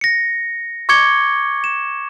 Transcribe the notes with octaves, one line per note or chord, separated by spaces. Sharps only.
A#6 C#7
C#6 D6 G#6 C#7 G7
E7